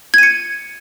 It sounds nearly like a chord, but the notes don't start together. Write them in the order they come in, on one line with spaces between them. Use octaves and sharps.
G#6 D#7 C#7